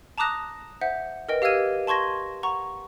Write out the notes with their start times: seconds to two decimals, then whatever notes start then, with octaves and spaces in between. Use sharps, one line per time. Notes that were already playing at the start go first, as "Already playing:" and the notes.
0.18 A5 A#5 D6 D#6 F#6 A#6
0.81 C5 E5 F#5 G6
1.29 A#4 B4 D#5 G5
1.42 G4 F5 E6 F6 G#6 D#7
1.87 A5 C6 C#6 G#6 A#6
2.43 F#5 A#5 C#6